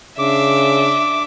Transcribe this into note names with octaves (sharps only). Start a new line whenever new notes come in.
C#3 D4 E5 D6